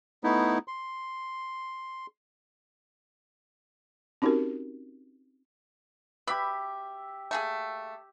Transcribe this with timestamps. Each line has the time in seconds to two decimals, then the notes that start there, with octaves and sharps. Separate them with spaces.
0.24 A3 B3 D#4 E4
0.68 C6
4.22 C4 C#4 D#4 F#4 G4 A#4
6.27 G4 B4 D5 E5 B5
7.31 A3 A#3 G#4